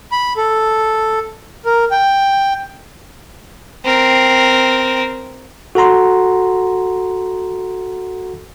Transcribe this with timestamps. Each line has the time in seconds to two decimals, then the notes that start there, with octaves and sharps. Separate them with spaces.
0.12 B5
0.37 A4
1.65 A#4
1.91 G5
3.84 C4 A#4
5.75 F#4 A4 F#5 A#5 C6